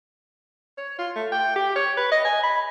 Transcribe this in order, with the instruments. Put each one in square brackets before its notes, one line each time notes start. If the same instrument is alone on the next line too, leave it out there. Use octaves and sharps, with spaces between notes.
[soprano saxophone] C#5
F4
A3
G5
G4
C#5
B4
D#5
G#5
B5